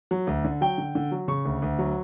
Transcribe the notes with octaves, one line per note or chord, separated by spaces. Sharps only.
F#3
D2
D3
F#3 G5
D3
D3
F#3
C#3 C#6
D2
D2
F#3